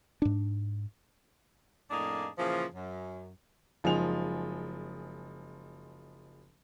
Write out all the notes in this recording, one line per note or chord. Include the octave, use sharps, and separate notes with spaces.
G#2 D4
F2 A2 A#3 D4 D#4 G#4
A#2 C#3 E3 F3
F#2
F#1 F3 G#3 D#4 G#5 F7